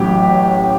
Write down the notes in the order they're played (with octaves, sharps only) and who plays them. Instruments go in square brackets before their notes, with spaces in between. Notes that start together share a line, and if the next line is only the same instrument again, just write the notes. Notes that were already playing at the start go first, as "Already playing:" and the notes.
Already playing: [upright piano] A1 A2 F#3 G4